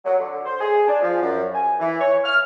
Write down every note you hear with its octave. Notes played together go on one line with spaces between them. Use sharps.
F#3
D3
C5
G#4
D4
F3
F#2
G#5
E3
C#5
F6